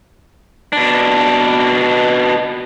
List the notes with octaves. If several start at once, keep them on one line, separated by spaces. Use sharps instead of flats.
B2 D4